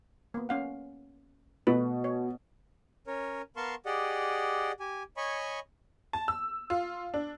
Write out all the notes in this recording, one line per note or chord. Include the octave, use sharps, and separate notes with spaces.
A#3 B3
C#4 F5 F#5
B2 A3 F#4 B4
C#5
C#4 A#4 C#5
B3 A#4 F5 A5 C6 C#6
G4 G#4 D5 D#5 F#5
G4 G#5
C#5 D#5 G#5 B5 C#6
A5
E6
F4
D4